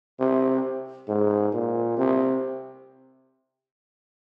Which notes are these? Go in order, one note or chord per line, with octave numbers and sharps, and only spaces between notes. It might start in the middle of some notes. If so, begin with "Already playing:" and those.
C3
G#2
A#2
C3